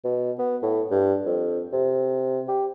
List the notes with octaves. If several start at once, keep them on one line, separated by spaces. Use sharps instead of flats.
B2
B3
A2
G2
F2
C3
G4